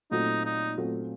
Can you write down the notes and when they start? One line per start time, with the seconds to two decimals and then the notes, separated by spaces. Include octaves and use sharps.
0.11 A#2 F#3 A3 C4 D#4
0.45 D#4
0.77 A#2 F#3 A3 C4